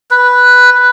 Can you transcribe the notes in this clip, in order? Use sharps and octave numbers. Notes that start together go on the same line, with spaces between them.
B4